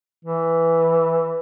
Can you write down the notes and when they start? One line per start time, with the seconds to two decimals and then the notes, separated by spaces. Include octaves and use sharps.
0.25 E3